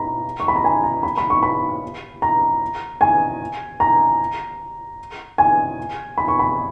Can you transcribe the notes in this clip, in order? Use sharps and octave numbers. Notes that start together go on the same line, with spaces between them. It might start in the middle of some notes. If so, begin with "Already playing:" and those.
Already playing: A#5 B5
C#6
B5
A#5
G#5
A#5
B5
B5
C#6
B5
A#5
G#5
A#5
G#5
B5
C#6
B5